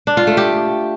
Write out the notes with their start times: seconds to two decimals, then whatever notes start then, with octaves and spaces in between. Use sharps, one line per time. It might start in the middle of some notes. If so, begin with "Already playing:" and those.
0.07 D4
0.17 F4
0.27 A3
0.37 G4